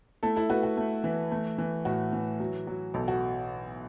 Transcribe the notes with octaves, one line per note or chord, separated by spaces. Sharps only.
A3 E4 A4
E4 A4
A3 F#4 B4
F#4
A3
E3
A3
E3
A2 F#4
E3
F#3
F#3
B1 A4
F#4